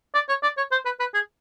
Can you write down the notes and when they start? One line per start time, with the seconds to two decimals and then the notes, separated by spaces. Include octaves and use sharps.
0.15 D5
0.28 C#5
0.43 D5
0.57 C#5
0.72 C5
0.85 B4
1.00 B4
1.14 G#4